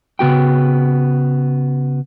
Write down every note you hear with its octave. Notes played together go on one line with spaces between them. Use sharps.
C#3 B3 F#4 G5